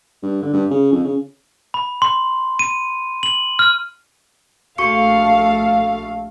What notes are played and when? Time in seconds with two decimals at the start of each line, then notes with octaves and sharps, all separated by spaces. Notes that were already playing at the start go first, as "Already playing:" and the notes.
0.23 G2
0.42 D3
0.53 G2
0.71 C#3
0.92 F2
1.05 C#3
1.74 B5
2.02 C6
2.59 D#7
3.23 F#7
3.59 F6
4.78 A#1 A3 F#4 F5 C#6 C#7